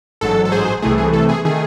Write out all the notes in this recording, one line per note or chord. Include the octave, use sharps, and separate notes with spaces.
A1 G#2 F#3 A4
A4
G#4 C5
C2 C3 E3 A3 G#4
G#4
A4
G#4
D#3 A3 G#4